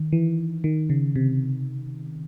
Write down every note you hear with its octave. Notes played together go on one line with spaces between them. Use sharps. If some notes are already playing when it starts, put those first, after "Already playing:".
Already playing: D#3
E3
D#3
C#3
C3